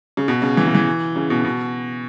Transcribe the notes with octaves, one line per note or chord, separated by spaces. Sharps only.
C#3
B2
C#3
E3
C#3
E3
C#3
B2
B2